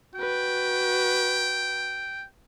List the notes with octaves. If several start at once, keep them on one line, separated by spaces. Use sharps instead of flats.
F#4 B4 G5